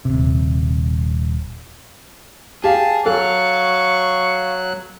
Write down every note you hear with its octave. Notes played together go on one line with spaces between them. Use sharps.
D#1 C3
G4 G#4 F5 A5
F#3 A4 F5 C#6 F#6